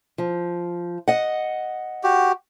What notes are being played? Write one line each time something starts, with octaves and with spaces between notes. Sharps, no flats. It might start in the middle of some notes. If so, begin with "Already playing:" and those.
F3
D#5 F#5
F#4 G4